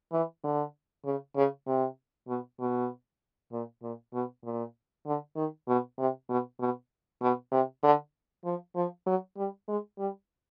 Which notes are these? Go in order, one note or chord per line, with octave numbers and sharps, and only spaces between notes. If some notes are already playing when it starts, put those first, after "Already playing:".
E3
D3
C#3
C#3
C3
B2
B2
A#2
A#2
B2
A#2
D3
D#3
B2
C3
B2
B2
B2
C3
D3
F3
F3
F#3
G3
G#3
G3